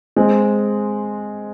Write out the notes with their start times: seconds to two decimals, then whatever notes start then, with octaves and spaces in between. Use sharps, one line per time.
0.16 G#3 C4